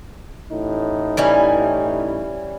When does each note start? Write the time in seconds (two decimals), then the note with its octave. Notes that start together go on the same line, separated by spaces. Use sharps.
0.52 A1 A2 D#4
1.17 E3 G3 C#4